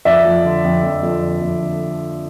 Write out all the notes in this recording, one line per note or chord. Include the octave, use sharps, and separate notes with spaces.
F2 D5 E5
F3
D3
F2
F2
F2
D3
F2
D3